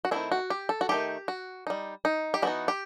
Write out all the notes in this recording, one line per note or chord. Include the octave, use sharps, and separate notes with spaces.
F#4
D#3 F#3 A3 C4 E4
F#4
G4
A4
F#4
D#3 A3 D#4 G4
F#4
G3 D#4
D#4
G4
E3 B3 D#4 F#4
G4